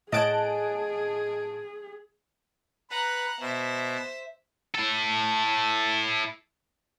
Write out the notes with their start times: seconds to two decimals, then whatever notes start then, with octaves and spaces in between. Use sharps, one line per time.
0.12 A2 G#4 D#5 F#5 G#5 A5 D7
2.90 B4 F#5 A#5
3.40 B2 C5 E5
4.74 E4 A4